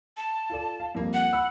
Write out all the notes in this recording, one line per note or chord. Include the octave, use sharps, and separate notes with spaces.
A5
F4 A4 D5
F5
F2 G3 A#3
F#5
B5 E6